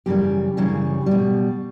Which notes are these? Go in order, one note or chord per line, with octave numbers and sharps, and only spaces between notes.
F#2 C#3 E3 G3 G4
F#2 C#3 E3 G3
B2 G3